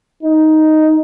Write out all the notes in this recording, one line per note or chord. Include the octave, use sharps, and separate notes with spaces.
D#4